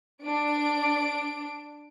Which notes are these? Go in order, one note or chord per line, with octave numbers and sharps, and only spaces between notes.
D4 D7